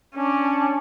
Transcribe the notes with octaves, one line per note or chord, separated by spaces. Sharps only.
C#4 D4